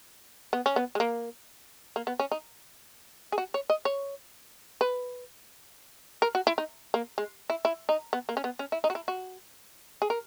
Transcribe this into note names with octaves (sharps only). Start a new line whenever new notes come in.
B3
C#4
B3
G#3
A#3
A#3
B3
C#4
D#4
G#4
F#4
C#5
D#5
C#5
B4
A#4
F#4
E4
D#4
A#3
G#3
E4
E4
D#4
B3
A#3
C#4
B3
C#4
E4
D#4
F#4
E4
F#4
G#4
A#4